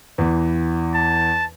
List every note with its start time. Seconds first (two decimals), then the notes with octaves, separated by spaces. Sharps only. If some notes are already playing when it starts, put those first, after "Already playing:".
0.18 E2 E3
0.95 A5